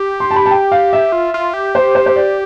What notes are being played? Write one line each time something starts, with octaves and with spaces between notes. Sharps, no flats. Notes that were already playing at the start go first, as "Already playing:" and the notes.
Already playing: G4
C6
A5
B5
A5
G5
F5
E5
F4
F4
G4
C5
C5
C5
D5